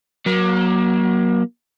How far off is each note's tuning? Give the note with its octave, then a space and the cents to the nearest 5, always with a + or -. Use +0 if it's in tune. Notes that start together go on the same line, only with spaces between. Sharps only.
F#3 +0 A#3 +30